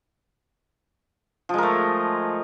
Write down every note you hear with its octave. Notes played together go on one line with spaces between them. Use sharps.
F3 G#3 A3 A#4